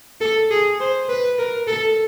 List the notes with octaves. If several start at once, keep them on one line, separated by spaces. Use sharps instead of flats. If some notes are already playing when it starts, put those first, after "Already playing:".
A4
G#4
C5
B4
A#4
A4